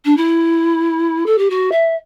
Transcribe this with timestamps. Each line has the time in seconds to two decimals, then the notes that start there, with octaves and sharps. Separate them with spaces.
0.05 D4
0.17 E4
1.26 A4
1.38 G4
1.50 F#4
1.72 E5